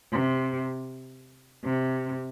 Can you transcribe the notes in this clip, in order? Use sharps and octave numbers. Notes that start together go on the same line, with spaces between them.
C3
C3